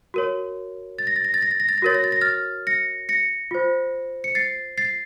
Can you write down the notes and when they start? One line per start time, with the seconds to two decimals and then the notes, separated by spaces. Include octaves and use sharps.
0.14 F#4 A#4 C#5
0.99 A6
1.07 A#6
1.16 A6
1.25 A#6
1.34 A6
1.42 A#6
1.51 A6
1.60 A#6
1.69 A6
1.78 A#6
1.82 F#4 A#4 C#5 A6
1.94 A#6
2.04 A6
2.12 A#6
2.21 F6 A6
2.67 A#6 C#7
3.09 A#6 C#7
3.51 F4 C5
4.24 C#7
4.35 A6 C7
4.77 A6 C7